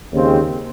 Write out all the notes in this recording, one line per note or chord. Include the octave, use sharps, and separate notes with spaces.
D#2 C#3 G#3 C4